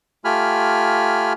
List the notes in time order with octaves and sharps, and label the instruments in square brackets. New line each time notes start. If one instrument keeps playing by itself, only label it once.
[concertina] A3 F4 G4 G#5 B5 F6